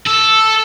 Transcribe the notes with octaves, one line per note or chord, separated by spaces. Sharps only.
A4